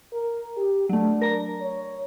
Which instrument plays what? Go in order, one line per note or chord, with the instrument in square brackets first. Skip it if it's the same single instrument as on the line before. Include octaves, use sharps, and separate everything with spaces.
[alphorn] A#4
G4
[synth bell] F#3 A3 [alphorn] D4
[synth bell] A#4 A#5
[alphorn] C#5